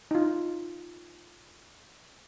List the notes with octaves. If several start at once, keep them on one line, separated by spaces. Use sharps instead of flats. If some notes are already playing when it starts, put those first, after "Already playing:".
D#4 F4